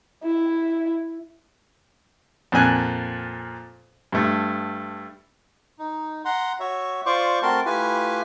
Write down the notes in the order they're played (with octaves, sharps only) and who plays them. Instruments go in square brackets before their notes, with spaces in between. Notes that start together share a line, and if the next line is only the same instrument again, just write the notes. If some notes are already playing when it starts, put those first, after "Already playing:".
[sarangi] E4
[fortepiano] F2 A#2 G#5 F#6
G2 A3
[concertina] D#4
F#5 A#5 C6
F#4 C#5 E5
F4 C5 D5 C#6 D6
A3 C4 F#4 A#4 A5 C6
A3 E4 F4 G4 B4 G#5